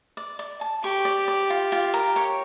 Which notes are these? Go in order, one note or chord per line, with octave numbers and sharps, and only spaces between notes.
D5
D5
A5
G4 C#6
D5
D5
F4
F4
A#4
C#5